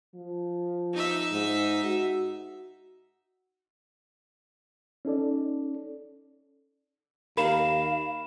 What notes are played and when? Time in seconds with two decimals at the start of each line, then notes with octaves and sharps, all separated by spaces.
0.15 F3
0.93 D#4 E5
1.32 G#2
1.84 F#4
5.05 C#4 D#4 A4 D5
7.37 D#2 A#4 F5 B5 E7